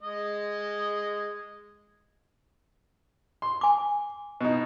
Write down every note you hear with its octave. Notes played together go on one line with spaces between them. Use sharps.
G#3 D#5
C6
G#5 D6
B2 D#4